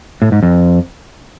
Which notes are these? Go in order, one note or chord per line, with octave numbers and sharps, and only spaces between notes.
A2
G#2
F2